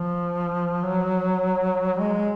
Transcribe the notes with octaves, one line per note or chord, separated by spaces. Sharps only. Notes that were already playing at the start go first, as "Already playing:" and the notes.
Already playing: F3
F#3
G#3